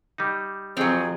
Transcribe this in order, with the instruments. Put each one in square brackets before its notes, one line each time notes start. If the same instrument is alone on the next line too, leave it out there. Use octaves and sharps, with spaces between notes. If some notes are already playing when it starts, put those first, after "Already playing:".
[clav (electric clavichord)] G3 D#4
[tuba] F2 [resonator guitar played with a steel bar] F#3 C4 [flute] G#4